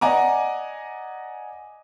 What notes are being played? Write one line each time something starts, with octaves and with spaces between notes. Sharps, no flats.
D5 D#5 F#5 G#5 A#5 D6